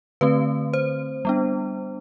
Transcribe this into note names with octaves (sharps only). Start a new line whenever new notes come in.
D3 A3 C4 B4
C5
G3 B3 D4